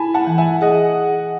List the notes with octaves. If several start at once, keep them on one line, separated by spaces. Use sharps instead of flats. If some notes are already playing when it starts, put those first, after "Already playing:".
Already playing: E4 G#5 A5 B5
F#5 A5
E3
E5 G#5
G#4 D#5 F#5